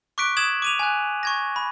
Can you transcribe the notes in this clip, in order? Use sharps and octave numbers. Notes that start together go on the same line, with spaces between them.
C#6 D6 F#6 B6 D7
D#6 G#6 E7 F#7
D6 D#7 F7
G#5 F#6
C#6 G#6 A#6
B5